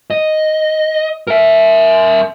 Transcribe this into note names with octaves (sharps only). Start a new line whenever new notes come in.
D#5
A#4 E5